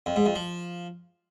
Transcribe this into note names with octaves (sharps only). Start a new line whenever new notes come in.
F2
G#2
F2
F3